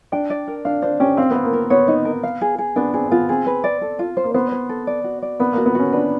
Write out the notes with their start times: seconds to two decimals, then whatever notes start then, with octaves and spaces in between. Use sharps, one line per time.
0.12 D4 G5
0.30 D5
0.47 A#4
0.65 D4 F5
0.82 D4 C5
1.00 C#4 G4
1.17 C4 F5
1.31 B3 F5
1.44 A#3
1.53 A#4
1.70 B3 C#5
1.88 D#4
2.05 A#4
2.23 F5
2.41 G#4
2.58 G#4
2.76 B3 D4
2.94 C4 G#4
3.11 B3 F4
3.29 C4 G#4
3.46 B4
3.64 D5
3.81 A4
3.99 F4
4.17 C5
4.24 A#3
4.34 B3 C5
4.52 C5
4.69 A4
4.87 D5
5.04 F#4
5.22 D5
5.40 B3 B4
5.53 A#3 F#4
5.66 B3
5.75 C#4 F#4
5.92 D4 B4